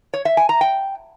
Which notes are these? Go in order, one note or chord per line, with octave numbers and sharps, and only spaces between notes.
C#5
E5
G#5
A#5
G5